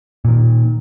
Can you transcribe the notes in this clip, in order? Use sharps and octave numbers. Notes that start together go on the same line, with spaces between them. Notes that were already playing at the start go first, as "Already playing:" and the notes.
A#2 D#3